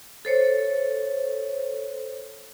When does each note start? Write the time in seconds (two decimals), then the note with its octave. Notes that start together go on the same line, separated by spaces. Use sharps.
0.25 A4 C5 C#5